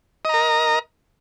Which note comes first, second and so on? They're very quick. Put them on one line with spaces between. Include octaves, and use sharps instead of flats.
D#5 A#5 A#4